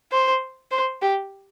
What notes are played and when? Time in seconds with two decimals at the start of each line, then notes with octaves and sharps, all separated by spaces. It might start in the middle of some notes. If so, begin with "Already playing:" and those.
0.12 C5
0.71 C5
1.02 G4